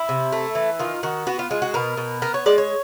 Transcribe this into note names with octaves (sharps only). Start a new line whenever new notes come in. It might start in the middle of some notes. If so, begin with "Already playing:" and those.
Already playing: E4
C3
A3
E3
D#3 F4
D#3 F#4
B3 F#4
F4
G#3 F4
F#4
B2 A#4
B2
B3 A#4
C#5
G#3 D5
C#5